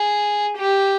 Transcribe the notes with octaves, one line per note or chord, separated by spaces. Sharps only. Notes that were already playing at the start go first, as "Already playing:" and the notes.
Already playing: G#4
G4